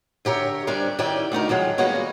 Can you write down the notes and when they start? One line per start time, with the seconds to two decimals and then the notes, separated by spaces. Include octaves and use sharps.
0.25 D3 G4 A#4 C#5 E5
0.67 G3 C#4 D4 A#4 C5 D5
0.99 D#3 C#4 E4 G4 D5 G5
1.32 D2 A3 D#4 A#4
1.49 D#3 F3 F#3 G#3
1.78 G3 G#3 A#3 B3 C#4 F#4